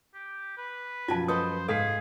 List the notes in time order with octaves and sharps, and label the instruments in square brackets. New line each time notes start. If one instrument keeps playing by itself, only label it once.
[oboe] G4
B4
[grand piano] F#2 F3 [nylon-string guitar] B2 G#5 [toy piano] F4 A5
[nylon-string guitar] A4 B4 D#5 [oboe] C5 [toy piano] D#6
[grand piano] G#2 B6 C7 [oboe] G#4 [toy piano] A4 [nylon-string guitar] F5